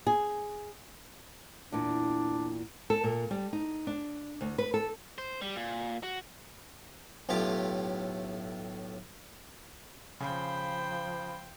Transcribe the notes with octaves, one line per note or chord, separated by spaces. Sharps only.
G#4
E2 A#2 D4
A4
A#2
G3
D#4
D4
D2
B4
A4
C5
G3
A#2
F#4
B1 A2 F4 G4
C#3 F3 C5 G5 B5